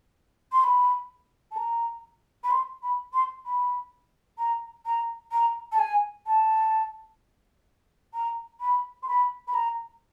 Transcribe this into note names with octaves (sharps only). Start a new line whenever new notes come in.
C6
B5
A5
A#5
B5
C6
B5
C6
B5
A#5
A#5
A#5
A5
G#5
A5
A#5
B5
C6
B5
B5
A#5